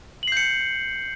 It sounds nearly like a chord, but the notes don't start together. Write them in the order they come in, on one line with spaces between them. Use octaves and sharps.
F#7 C7 G6 C#7